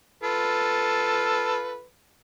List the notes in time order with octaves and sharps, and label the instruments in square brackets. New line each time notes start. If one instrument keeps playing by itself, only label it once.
[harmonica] F4 A4 B4